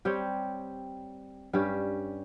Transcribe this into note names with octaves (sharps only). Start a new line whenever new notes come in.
G3 C4 G4 C#5
G2 G3 C#4 G4